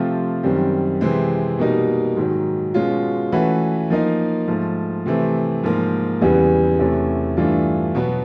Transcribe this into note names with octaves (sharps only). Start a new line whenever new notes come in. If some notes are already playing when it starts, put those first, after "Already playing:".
Already playing: C3 F3 A3 C4 F4
F#2 D#3 G3 C4
C3 E3 G#3 C4
B2 G3 A#3 D#4
G#2 D#3 F#3
B2 G#3 C#4 F4
E3 A3 C#4 F#4 B4
F3 A#3 D#4
G#2 F3 A3
C3 E3 A3 C4
G#2 F3 A#3
E2 C#3 E3 G3 B3
E2 C3 E3 A3 C#4
G2 E3 A3 D4 F4
B2 F#3 B3